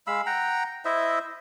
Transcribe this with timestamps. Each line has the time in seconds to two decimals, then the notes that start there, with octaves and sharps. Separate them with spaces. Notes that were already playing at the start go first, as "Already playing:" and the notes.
0.07 G#3 F5 B5 E6
0.26 F#5 G5 A#5
0.85 E4 C5 D#5 E5